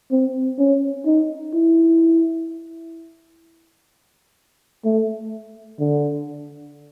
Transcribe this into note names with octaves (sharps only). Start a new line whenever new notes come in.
C4
C#4
D#4
E4
A3
D3